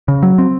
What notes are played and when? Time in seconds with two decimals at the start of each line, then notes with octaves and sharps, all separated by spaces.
0.08 C#3
0.23 F#3
0.38 C4